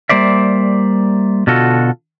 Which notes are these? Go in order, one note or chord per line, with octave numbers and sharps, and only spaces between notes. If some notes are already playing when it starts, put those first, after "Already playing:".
G3 A#3 C5 D5 E5
B2 D3 F4 F#4 A4